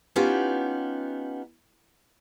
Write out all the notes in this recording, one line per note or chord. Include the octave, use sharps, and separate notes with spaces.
B3 C#4 D#4 F4 G4